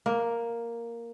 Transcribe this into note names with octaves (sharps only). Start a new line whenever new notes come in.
A#3